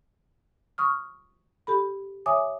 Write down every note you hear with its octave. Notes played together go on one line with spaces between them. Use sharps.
C#6 D#6 F6
G4 A4 B5
C#5 E5 G#5 D6 D#6